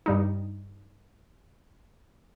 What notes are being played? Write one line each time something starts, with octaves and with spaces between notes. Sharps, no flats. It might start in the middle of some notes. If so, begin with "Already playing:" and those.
G2 G3 D#4